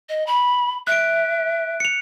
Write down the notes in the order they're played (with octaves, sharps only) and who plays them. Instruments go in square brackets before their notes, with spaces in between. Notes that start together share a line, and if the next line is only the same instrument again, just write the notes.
[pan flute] D#5
B5
[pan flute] E5 [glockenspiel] F#6 D7
[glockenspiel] C#7 F7